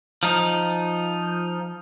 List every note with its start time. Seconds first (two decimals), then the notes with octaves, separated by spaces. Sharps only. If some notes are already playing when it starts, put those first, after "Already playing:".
0.23 F3 D#4